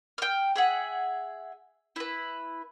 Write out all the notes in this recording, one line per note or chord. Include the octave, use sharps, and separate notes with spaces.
G5 F6
G#4 E5 F#5
E4 B4